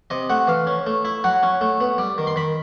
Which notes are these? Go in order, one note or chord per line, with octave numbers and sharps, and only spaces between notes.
C3 D#5
A3 F#5
E3 F5
C#4
A3
E4
F#3 F#5
C#4
A3
B3
G3
D#3
C6
D#3 B5